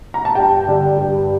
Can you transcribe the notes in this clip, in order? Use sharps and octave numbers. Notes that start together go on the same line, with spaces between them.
A#5
A5
G2 G5
D3 G3 D4
G2